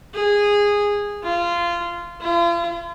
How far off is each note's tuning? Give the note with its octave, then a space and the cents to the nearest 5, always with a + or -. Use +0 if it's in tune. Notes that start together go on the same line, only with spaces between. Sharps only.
G#4 -15
F4 -20
F4 -40